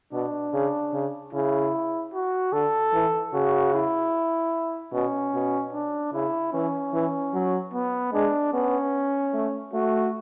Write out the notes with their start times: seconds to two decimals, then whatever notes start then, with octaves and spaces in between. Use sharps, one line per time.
0.13 B2 D4
0.53 C#3
0.93 C#3
1.33 C#3 E4
2.14 F#4
2.53 D3 A4
2.93 E3
3.33 C#3 F#4
3.73 E4
4.93 B2 C#4
5.34 B2
5.73 D4
6.13 C#3 E4
6.53 E3 C#4
6.93 E3
7.34 F#3
7.73 B3
8.13 G#3 D4
8.53 B3 C#4
9.34 A3
9.73 A3 F#4